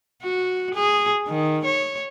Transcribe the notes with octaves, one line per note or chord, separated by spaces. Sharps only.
F#4
G#4
D#3
C#5